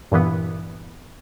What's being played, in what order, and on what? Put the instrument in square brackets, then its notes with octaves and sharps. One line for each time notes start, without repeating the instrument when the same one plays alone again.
[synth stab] G2 A#2 E3 B3